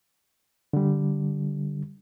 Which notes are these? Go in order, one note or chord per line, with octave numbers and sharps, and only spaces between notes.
D3 G3